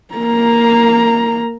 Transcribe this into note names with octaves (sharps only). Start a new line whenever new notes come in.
A#3 A#5